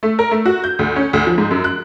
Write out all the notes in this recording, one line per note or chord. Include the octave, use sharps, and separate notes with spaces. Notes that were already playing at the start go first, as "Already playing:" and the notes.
A3
A#4
A3
F#4
G6
D2
C#4
D2
F3
G#2
F#2
F#6